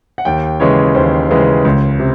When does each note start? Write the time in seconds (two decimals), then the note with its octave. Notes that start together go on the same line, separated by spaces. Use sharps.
0.18 F#5
0.25 D#2 G5
0.60 C#3 E3 G#3 C#5
0.95 D#2 C5
1.31 C#3 E3 G#3
1.65 C#2
1.99 C3